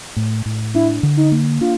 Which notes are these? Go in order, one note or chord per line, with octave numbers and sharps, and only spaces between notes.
A2
A2
D4 E4
D3
D#4
A#3
D4 F4